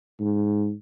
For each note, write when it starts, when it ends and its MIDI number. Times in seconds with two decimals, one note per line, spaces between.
0.20 0.73 44